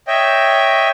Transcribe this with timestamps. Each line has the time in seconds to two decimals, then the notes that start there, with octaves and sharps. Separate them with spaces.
0.08 C#5 D#5 E5 G5